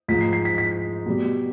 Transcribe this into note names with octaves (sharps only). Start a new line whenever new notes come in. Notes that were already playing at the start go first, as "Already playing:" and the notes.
G#2 F3 G#3 B6
C7
C7
B6
B6
B2 G3